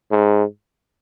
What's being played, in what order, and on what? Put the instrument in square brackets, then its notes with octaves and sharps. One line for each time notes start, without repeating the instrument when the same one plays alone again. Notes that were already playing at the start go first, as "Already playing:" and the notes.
[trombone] G#2